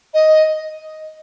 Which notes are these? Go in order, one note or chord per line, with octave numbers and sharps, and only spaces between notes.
D#5